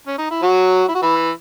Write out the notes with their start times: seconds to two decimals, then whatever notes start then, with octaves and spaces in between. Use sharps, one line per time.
0.07 C#4
0.18 D#4
0.31 E4
0.42 F#3 F#4
0.88 E4
0.95 F#4
1.02 E3 E4